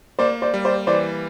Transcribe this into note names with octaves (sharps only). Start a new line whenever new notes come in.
A#3 C5 D5
C5 D5
G3
C5 D5
E3 C5 D5